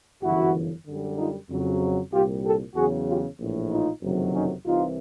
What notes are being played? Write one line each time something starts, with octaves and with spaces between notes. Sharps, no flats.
G1 F#2 C#3 E3 E4 F#4
F#2 D3 G3
D#4 F4
F2 C#3 F#3
C2 A#2 G3 F4 G4
G4 A4
E2 C#3 F#3 F#4 G#4
F4 G4
A#1 A2 E3
D#4 F4
F#1 F2 C3 D#3 F#3
C#4 D#4
C2 C3 E3 D#4 F4